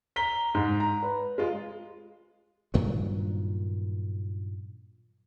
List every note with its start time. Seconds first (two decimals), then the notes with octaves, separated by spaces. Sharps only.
0.16 A#5 B6 G7
0.54 G#2
0.80 A#5
1.03 B4
1.38 G#3 F4
2.74 G2 A#2 D#3 F#3